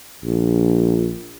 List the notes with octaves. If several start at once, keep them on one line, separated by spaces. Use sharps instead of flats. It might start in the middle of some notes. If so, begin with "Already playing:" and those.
A#1